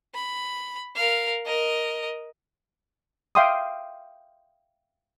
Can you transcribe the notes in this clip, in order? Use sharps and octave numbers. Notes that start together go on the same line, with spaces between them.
B5
A#4 F5
A#4 D#5
E5 F5 G5 C6 D6 D#6